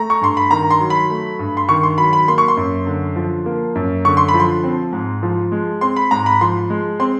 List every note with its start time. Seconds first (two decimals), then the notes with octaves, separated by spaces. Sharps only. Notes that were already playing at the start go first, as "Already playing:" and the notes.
Already playing: A3 A#5
0.10 C#6
0.21 G2 C6
0.37 B5
0.51 D#3 A#5
0.70 C6
0.80 F#3
0.90 B5
1.10 A3
1.39 G2
1.57 C6
1.69 D#3 C#6
1.83 C6
1.98 F#3 B5
2.13 B5
2.28 A#3 C6
2.38 C#6
2.48 C6
2.57 F#2
2.87 D3
3.16 F3
3.46 A#3
3.75 F#2
4.05 D3 C#6
4.17 C6
4.29 B5
4.34 F3
4.40 C6
4.64 C4
4.93 G#2
5.23 F3
5.52 G#3
5.81 C4 C6
5.97 B5
6.11 G#2 A#5
6.26 B5
6.41 F3 C6
6.70 G#3
7.00 C4 C6